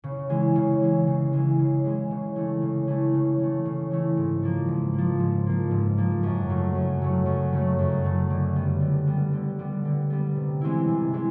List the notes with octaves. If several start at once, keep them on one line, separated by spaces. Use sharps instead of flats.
C#3
E3 G#3
C#3
E3 G#3
C#3
E3 G#3
C#3
E3 G#3
C#3
E3 A3
C#3
E3 A3
C#3
E3 A3
C#3
E3 A3
G#2
F3 A#3
G#2
F3 A#3
G#2
F3 A#3
G#2
F3 A#3
F#2
C#3 F#3 A3
F#2
C#3 F#3 A3
F#2
C#3 F#3 A3
F#2
C#3 F#3 A3
D3
G3 B3
D3
G3 B3
D3
G3 B3
D3
G3 B3
C3
E3 G#3 C4 E4
C3
E3 G#3 C4